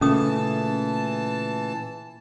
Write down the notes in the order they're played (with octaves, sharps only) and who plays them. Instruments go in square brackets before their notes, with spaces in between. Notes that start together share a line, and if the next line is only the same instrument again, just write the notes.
[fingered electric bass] A#2 C#3 A3 [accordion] E3 A5 [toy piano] C#4 D#6